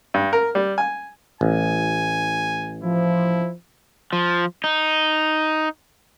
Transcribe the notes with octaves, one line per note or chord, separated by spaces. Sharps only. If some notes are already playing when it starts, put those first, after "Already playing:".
G2
A#4
G3
G#5
A1 G#5
F3 E4
F3
D#4